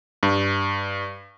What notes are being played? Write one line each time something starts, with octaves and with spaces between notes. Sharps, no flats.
G2